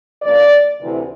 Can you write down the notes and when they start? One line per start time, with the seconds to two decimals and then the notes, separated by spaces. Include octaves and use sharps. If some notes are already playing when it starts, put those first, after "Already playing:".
0.22 D2 C#3 F3 A#3 D5
0.80 D2 C3 E3